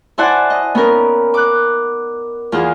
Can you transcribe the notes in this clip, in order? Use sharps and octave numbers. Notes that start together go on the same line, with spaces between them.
E4 C5 D5 F#5 G#5 A5
D#5
B3 C#4 D#4 A#4
D6 F#6
E2 F4 G#4